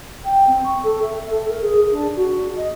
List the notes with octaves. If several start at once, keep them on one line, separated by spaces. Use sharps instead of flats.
G5
C4
C#6
A4
E5
A4
A#4
G#4
D4
F#4
D#5